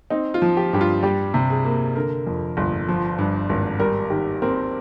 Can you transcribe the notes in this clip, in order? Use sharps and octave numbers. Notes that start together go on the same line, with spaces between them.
C4 D#4
F4
F3
G4
G2 G4
F4
G3 G4
C3
G#4
A#3
D3 A#4
F2
G1
F3
G2
G#1
G3 A#4
D#3 G4
C4 A#4